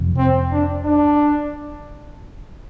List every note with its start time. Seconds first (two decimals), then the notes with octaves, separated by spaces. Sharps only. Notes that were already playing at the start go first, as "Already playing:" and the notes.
Already playing: F2 C3 F3
0.17 C4
0.52 D4
0.85 D4